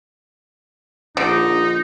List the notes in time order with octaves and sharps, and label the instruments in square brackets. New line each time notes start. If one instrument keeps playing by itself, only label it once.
[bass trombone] A#1 [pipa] D3 [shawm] D#4